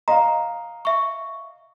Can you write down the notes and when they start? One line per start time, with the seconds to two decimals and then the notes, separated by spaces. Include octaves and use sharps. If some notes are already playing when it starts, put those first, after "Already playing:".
0.08 D#5 F5 A#5
0.85 E5 C#6